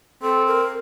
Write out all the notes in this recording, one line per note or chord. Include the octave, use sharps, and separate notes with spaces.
C4 A4
A#4